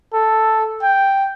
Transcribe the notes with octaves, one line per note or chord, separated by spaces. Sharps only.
A4
G5